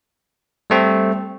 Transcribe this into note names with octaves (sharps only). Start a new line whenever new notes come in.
G3 A3 C4